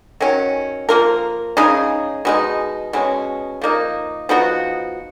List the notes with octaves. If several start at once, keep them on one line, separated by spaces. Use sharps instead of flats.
D#3 F#3 C#4
F3 A#3 F4 A#4
C#3 G#3 D#4 G#4
B2 G#3 D#4
B2 G#3 C#4
F3 A#3 D#4
F3 B3 D#4 F#4